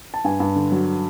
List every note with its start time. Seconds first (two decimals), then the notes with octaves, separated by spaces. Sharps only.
0.14 A5
0.24 G2 G#5
0.40 G2
0.56 D3
0.72 F#3